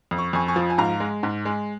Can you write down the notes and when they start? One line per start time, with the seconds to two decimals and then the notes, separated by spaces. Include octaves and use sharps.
0.11 F2
0.18 C#6
0.33 F2 G#5 C#6
0.48 G#5 C#6
0.56 F3
0.70 G#5
0.78 G#2 F5 A#5
1.00 G#3
1.23 G#2
1.45 G#3